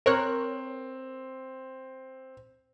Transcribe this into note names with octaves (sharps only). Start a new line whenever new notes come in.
C4 A#4 C#5 F#6